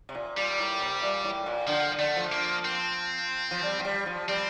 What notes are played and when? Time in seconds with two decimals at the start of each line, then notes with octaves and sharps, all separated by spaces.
0.09 C3
0.15 A#2
0.37 A#2 G3
0.59 A2
0.81 C3
1.03 A#2
1.24 A2
1.46 A#2
1.67 D3 F3
1.99 D3 A3
2.16 F3
2.32 A#3
2.65 C4
3.51 F3
3.63 G3
3.80 F3
3.85 G3
4.06 F3
4.28 G3 C4